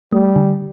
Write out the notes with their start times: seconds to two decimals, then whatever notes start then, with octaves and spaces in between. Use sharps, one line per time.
0.12 G3 A3
0.36 D3